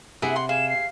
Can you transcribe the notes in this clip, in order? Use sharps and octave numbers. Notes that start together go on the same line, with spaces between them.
C3 E4 G#4 E5 F#5
C6
G#4 F5 E7
C7